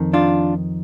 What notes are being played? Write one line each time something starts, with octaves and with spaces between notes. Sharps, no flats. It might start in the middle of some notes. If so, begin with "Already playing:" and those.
Already playing: F2 D#3
D4 F4